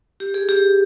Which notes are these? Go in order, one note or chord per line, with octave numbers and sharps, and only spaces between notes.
G4
G#4
G4